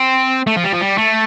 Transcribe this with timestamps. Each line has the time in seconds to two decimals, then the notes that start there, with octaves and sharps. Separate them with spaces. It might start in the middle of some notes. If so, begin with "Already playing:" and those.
Already playing: C4
0.47 A3
0.56 F3
0.64 G3
0.72 F3
0.81 G3
0.98 A3